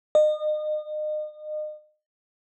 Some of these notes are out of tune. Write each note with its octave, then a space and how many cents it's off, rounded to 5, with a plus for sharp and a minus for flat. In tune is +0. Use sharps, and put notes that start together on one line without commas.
D#5 -35